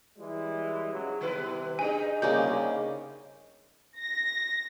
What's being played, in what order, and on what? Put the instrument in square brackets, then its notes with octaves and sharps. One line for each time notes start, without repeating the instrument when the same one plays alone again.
[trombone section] E3 G3 G#3
G#2 C#3 F#3
[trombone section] C2 C3 [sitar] D#3 B3 B4
[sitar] G#2 D4 D#4 [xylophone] G#4 G#5
[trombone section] C2 [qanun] C#3 A#3 D5 [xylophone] G6
[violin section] A#6